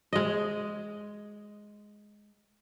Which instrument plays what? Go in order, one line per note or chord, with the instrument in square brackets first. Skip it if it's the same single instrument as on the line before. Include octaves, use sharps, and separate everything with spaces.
[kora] G#3 D#5